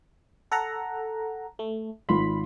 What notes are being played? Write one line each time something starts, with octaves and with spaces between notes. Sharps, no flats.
A4 F#5 A#5
A3
G#1 F4 B5 C6